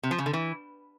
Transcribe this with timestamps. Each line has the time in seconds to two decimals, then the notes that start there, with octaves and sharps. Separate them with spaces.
0.03 C3
0.11 F3
0.18 C#3
0.26 D3
0.33 E3